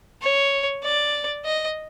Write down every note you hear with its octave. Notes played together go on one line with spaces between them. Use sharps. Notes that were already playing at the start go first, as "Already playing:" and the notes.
C#5
D5
D#5